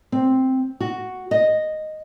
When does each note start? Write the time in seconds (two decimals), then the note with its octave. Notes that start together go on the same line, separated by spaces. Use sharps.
0.12 C4
0.80 F#4
1.31 D#5